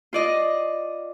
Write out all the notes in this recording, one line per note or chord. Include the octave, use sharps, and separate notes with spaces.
F4 D5 D#5